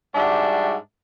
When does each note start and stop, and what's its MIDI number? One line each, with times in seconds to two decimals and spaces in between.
0.15 0.75 44
0.15 0.75 55
0.15 0.75 62
0.15 0.75 66
0.15 0.75 76